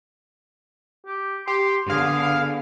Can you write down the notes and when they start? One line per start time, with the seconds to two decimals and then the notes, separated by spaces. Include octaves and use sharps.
1.06 G4
1.47 G4 C6
1.90 D3 B3 G#4 F5